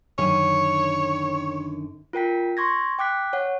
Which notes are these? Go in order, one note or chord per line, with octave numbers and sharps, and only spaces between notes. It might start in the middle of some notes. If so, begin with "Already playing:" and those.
F#2 D3 D#3 C#5
F4 A#4 G5 B6
C6 C#6 G#6 A#6
G5 D6 F#6 B6
C#5 F#5